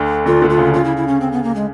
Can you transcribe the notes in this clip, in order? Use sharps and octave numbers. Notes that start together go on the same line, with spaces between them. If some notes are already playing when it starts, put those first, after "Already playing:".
Already playing: D2 D3
D2 D3 F4
D2 D3
F4
C#3
C#3 F4
E4
E4
C#4
C4
B3
A#3
G#3